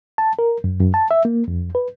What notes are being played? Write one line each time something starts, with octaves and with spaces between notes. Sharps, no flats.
A5
A#4
F#2
F#2
A5
E5
A#3
F2
B4